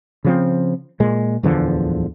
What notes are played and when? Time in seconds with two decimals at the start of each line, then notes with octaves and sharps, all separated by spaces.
0.24 C#3 F3 C4
1.00 A#2 G#3
1.43 D1 E2 D3 F3